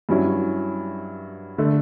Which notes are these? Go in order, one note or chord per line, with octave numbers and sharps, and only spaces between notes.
G2 F#3 C#4 E4
D3 A3